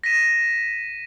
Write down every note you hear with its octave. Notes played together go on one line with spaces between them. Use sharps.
A#6 B6 D#7 E7